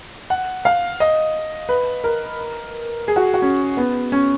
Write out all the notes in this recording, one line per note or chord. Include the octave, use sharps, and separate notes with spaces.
F#5
F5
D#5
B4
A#4
G#4
F#4
F#4
C#4
B3
C#4